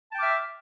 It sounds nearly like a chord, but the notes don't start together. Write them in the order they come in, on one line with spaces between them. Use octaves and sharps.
A5 G5 D6 F6 E5